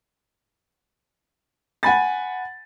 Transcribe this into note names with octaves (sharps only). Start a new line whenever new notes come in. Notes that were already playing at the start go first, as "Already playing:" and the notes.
F#5 G#5 B5 A6